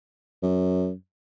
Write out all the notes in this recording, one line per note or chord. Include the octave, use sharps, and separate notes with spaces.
F#2